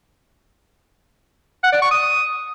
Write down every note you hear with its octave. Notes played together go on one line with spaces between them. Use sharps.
F#5
D5
C#6
D#6